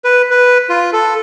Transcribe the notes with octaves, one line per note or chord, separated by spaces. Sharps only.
B4
B4
F4
A4